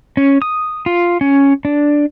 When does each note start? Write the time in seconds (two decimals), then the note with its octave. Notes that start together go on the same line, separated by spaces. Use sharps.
0.17 C#4
0.42 D#6
0.86 F4
1.21 C#4
1.65 D4